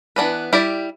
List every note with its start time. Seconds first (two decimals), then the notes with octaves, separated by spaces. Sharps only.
0.16 E3 B3 D4 B4
0.53 G3 E4 G4 D5